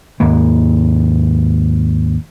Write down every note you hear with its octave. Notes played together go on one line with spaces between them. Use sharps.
D#2 G#2 G#3 A#3